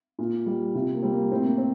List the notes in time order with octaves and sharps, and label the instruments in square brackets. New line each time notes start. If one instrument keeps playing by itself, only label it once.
[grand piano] A#2
G3
C3 F4
A#3
G3 C4
A#3
A2 C4
A#3
C4